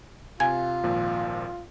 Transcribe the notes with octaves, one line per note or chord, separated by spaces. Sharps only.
C3 F4 F5 G#5 G#6
G#1 A#2 F3